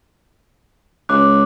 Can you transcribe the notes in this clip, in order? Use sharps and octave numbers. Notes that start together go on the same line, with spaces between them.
C#2 D6 F#6